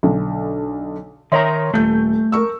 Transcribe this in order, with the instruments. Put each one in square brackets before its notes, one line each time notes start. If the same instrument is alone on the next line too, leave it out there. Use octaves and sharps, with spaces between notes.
[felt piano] B1 D3
[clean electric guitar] D#3 A#4 A#5 [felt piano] C#5 E5 C6
[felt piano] D#1 G6 [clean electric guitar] A3
[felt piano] A#4 C#6 E6